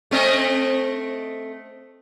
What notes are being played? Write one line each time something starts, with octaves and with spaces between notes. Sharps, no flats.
A3 C4 D#5